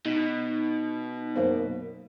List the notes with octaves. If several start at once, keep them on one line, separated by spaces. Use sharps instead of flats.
B2 D#4 B6
F#2 A#3 C4